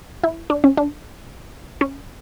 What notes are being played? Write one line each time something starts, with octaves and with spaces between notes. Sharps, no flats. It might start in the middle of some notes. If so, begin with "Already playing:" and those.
E4
D4
C#4
D4
C#4